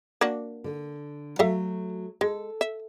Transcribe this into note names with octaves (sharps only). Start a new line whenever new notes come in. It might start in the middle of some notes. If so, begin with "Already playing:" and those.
A#3 D4 F#4
D3
F#3 A3 A4 E5 F5
G#3 A4
E5